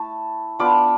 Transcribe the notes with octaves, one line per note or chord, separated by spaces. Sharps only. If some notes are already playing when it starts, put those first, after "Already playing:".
Already playing: A3 E4 A5
B3 D4 F4 B5 D6